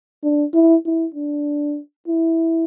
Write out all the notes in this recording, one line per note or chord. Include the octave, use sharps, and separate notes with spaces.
D4
E4
E4
D4
E4